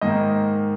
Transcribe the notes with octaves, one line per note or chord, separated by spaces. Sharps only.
G#2 D#3 A#3 D#5